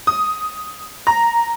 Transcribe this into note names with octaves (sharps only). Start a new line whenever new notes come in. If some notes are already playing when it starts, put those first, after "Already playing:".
D#6
A#5